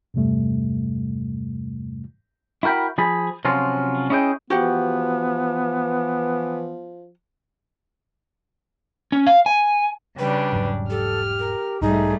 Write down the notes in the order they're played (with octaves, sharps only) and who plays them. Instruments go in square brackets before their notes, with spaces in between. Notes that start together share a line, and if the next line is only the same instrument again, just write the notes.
[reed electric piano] E2 G2 C3 G3 A3
[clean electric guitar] E4 F#4 A#4 G5 B5
F3 G#4 B5
C3 F3 F#3 C#4 F4
C#4 E4 G#4 D#5 G5
[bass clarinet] E3 [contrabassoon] F3 [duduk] B3 [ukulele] F#4 G4 F#5
[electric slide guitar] C#4
F5
G#5
[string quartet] C#3 G3 D4 [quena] B4
[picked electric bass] E1 G#2 F#3
[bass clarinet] G4 [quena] A4 [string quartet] F6
[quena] A#4
[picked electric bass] B1 G#2 [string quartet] G3 A3 [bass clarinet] D#4 [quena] G#4